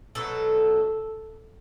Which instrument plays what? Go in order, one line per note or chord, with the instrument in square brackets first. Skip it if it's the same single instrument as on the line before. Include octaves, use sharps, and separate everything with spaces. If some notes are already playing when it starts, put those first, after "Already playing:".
[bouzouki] B2 F#3 A3 A4